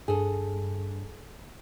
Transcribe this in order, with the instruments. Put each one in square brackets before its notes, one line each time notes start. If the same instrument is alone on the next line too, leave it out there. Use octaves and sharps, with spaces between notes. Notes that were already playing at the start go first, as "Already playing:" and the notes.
[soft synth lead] G2 [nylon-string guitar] G#4 A4